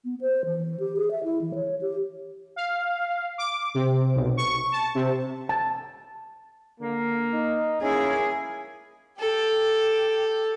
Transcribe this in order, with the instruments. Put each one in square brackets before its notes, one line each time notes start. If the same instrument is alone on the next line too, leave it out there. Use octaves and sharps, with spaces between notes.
[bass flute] B3
C5
E3
G4
G#4
E5
E4
E3
C#5
G4
[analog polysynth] F5
D6
C3
B1
C#6
A5
C3
[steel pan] A5
[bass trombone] D3 [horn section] A#3
[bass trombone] D#4
[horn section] A#3 E4 [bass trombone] C#4 [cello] G#4
[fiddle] G4 A4